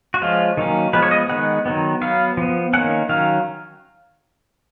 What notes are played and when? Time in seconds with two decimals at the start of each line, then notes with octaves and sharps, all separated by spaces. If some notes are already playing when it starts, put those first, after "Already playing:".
0.14 F#4
0.21 F3 G#3 C#4 F4
0.57 D#3 F#3 A#3 C#4
0.93 F3 G#3 B3 B4
1.02 C#5
1.11 D#5
1.29 D#3 G#3 B3 F#5
1.66 D#3 F#3 B3
2.01 F#3 B3 F5
2.37 F3 B3
2.73 D#3 A#3 C#4 F#5
3.09 D#3 F#3 C#4 F5